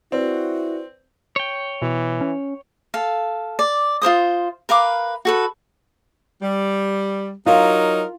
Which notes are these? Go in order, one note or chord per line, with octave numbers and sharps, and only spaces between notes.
C4 E4 F#4 B4 D5
C#5 G5
B2 E3
C#4
A4 F5
D5
F4 A#4 C5 D#6
A#4 B4 F5 D6
F#4 A4 B4
G3
F#3 D#4 F4 A#4